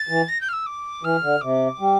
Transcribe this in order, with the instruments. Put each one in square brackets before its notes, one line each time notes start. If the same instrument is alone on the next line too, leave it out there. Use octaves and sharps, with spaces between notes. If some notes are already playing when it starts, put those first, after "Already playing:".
Already playing: [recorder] A6
[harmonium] E3
[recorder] A#6
G6
F6
E6
D6
[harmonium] E3 [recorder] F6
[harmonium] D3
[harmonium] C3 [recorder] D6
[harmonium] G3